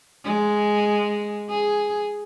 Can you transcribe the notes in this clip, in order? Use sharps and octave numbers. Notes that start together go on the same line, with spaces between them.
G#3
G#4